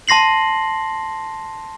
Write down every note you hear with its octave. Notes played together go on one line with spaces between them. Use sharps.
A5 C6 A#6 C7 F#7